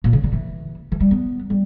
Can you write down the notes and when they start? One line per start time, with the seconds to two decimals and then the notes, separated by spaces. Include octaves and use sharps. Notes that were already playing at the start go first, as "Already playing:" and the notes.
0.04 A#2
0.13 C#3
0.24 D3
0.33 E3
0.92 E3
1.00 G3
1.11 B3
1.50 G3